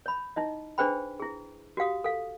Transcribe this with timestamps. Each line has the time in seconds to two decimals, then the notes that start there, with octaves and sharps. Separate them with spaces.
0.06 C#5 B5
0.36 D#4 E4 D#5
0.78 D4 G#4 B4 C5 G5 B5
1.20 E4 G#4
1.77 F#4 G4 F5 D#6
2.04 A4 F5